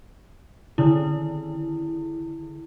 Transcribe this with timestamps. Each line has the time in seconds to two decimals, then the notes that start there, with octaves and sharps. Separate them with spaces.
0.78 D3 D#3 E4